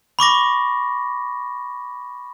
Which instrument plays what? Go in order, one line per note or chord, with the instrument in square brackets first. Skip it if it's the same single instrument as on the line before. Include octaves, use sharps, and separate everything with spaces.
[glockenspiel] B5 C#6 D6 A#6